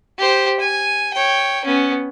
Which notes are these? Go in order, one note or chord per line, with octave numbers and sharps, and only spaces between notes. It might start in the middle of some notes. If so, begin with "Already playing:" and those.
G4 C5
G#5
C#5 G5
B3 C#4